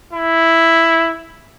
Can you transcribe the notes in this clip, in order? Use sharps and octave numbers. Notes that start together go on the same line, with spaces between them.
E4